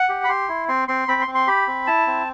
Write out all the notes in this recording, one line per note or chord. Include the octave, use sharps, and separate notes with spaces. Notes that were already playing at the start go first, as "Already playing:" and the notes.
Already playing: F#5
G4
B5
G4 C6
E4
C4 C6
C4 C6
C4 B5
C6
C4
C6
G4 B5
C4
E4 A5
C4